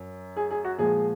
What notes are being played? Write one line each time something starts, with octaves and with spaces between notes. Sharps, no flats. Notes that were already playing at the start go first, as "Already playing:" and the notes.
Already playing: F#2
G#4
G#4
F#4
A#2 F3 G#3 G#4